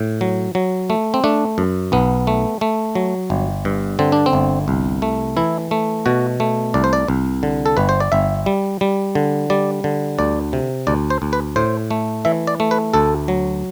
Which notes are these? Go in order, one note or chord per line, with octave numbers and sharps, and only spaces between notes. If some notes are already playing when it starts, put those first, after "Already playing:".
Already playing: A2
F#3
F#3
A3
C4
A3 D4
F#2
B1 B3
A3
A3
F#3
G1
G2
D3 C4
D4
C4
G1
C2
A3
E3 E4
A3
B2 F#4
A3
C2 D5
C5
D5
C2
D3
A4
G1 B4
C5
D5
G1 E5
G3
G3
D3
G3 D5
D3
D2 D5
C3
D2 D5
C5
D2
B4
A2 C5
A3
E3 E5
D5
A3
B4
D2 A4
F#3